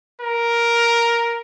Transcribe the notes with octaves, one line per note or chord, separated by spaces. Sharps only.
A#4